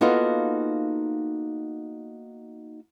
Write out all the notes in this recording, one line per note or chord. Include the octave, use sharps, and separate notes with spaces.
A#3 B3 D#4 F4 F#4 A4